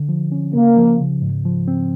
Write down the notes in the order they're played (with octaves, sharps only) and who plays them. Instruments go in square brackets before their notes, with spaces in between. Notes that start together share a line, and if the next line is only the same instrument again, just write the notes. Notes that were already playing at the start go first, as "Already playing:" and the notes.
Already playing: [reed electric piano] D3
F3
C#4
[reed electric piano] C#3 [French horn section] A#3
[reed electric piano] F3
C#3
G#2
F3
C4